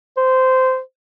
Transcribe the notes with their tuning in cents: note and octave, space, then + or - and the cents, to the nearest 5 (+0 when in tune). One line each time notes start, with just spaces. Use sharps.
C5 -15